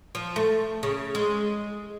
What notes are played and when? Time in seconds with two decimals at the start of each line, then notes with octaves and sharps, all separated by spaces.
0.15 F3
0.36 A3
0.83 C#3
1.15 G#3